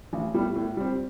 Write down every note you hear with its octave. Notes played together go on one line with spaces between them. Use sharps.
A1
A2 G3 B3
A2
G3 C4